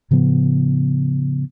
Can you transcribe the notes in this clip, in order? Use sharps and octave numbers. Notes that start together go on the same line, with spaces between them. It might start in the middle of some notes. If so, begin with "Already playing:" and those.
A2 C#3 F3 B3